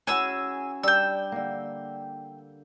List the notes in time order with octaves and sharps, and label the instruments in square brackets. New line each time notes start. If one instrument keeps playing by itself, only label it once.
[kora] C#4 E4 F#4 [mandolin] G#4 G#5 E6
[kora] G3 D4 [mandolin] G5 E6
[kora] D3 A#3